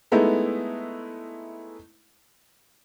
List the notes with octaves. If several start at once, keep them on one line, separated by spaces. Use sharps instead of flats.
G#3 A3 B3 D#4 E4